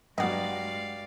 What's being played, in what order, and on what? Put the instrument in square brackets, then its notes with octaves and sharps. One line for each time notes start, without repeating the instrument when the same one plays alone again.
[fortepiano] G2 F#3 [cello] G#3 [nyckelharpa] D5 F5 [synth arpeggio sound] D#5 F#5